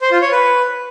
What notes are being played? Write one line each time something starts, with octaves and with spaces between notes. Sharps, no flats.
C5
F4
C#5
B4